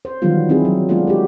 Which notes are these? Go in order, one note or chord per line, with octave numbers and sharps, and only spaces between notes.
C5
D#3 E3 F#3 G3 B3 F4
C4 D#4 E4 G#4
F#3
F#3 G#3 A3 B3 D4 F4
G#3 F#4 G4